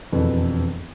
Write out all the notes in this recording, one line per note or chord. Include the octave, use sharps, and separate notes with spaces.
E1 F2 E3 A4 B4